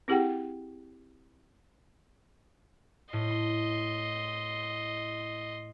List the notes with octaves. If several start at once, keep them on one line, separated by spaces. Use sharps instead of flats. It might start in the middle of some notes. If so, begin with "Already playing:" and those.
C4 E4 G4 G#4 F#5 G5
A2 D#5 C6